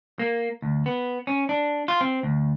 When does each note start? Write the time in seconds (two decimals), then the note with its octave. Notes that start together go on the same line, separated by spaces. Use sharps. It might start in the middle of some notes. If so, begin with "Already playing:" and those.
0.19 A#3
0.62 D2
0.86 B3
1.27 C#4
1.49 D4
1.88 F4
2.01 C4
2.23 D2